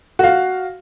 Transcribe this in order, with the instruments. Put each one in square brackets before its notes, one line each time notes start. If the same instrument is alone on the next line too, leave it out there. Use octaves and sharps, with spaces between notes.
[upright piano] F#4 F5